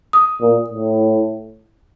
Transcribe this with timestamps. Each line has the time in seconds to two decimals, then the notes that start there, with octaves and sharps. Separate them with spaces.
0.13 D#6
0.41 A#2
0.69 A2